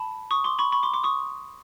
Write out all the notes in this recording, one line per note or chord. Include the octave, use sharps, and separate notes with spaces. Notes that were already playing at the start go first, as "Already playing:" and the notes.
Already playing: A5 B5
C#6 D#6
C6 D6
B5 C#6
B5 C#6
C6 D6
C6 D6
C#6 D#6